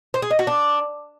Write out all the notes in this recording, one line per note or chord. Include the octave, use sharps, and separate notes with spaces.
C5
G#4
D#5
F#4
D4